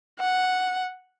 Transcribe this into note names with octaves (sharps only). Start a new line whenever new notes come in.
F#5